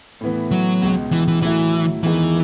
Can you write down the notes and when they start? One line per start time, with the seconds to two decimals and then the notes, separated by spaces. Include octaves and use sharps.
0.21 A2 E3 B3
0.51 F#3
0.82 C#2 B2 G#3
1.12 E3
1.28 E3
1.42 A2 E3 F#3 A3 E4
2.04 E2 D#3 E3 G#3 B3